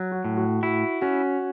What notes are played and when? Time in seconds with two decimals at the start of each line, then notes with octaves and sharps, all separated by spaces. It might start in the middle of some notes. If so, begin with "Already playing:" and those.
Already playing: F#3
0.12 F#4
0.25 A2
0.37 F#4
0.63 E4 F#4
1.01 C#4 F#4